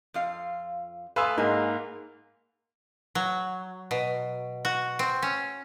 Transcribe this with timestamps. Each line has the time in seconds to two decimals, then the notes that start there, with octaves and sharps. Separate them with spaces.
0.14 F2 F4 F5
1.16 A3 A4 B4 F5 G#5 C6 D#6 E6
1.38 G#2 A#3 D#5 G#5
3.15 F#3
3.91 B2
4.65 F#4
4.99 C4
5.22 C#4